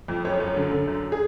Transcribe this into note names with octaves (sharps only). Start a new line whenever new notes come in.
F2
F#2 C#5
F#2
D3
D3
F#2
G#4